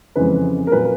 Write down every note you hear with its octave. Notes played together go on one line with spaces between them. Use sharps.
F2 C#3 E3 G#3 B4
A#4
A#2 F#3 B4